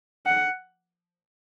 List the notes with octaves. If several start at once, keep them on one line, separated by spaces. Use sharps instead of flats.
F#5